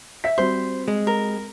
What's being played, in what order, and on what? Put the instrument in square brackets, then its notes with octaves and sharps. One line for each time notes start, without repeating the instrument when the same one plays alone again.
[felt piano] E5 B6
[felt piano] G3 C4 F#4 [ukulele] C5
[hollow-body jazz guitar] G#3
[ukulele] A#4